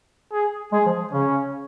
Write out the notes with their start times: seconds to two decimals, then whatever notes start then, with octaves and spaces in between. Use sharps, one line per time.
0.32 G#4
0.72 G#3 G#4
0.86 F3
1.12 C#3 C#4